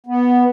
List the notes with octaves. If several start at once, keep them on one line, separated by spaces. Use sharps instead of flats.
B3